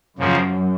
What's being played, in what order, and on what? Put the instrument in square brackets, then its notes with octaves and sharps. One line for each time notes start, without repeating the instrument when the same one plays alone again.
[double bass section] F#2 [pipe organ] C#3 F3 A#3